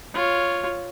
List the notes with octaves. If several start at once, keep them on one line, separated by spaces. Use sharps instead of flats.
F4 C#5